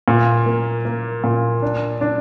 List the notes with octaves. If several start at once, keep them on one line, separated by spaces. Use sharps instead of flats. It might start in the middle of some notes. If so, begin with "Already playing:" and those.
A#2
A#3
A#3
A#2
D4
D4